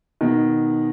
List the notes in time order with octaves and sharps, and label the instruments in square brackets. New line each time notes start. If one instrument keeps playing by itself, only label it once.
[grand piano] B2 D#3